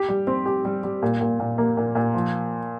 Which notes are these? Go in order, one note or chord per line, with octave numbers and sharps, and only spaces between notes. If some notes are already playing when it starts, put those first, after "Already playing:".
Already playing: G4
G3
C4
G4
G3
G3
A#2
A#2
A#2
A#3
A#2
A#2
F3